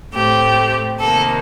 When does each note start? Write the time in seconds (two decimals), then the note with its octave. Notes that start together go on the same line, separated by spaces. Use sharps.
0.13 A2 A3 C4 G4
1.00 C3 D#3 A#3 A4